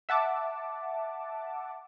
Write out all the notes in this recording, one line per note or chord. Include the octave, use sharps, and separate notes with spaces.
E5 F#5 A5 D6